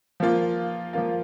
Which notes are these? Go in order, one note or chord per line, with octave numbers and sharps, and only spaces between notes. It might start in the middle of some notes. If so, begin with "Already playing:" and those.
F3 A#3 F4
F3 A#3 F4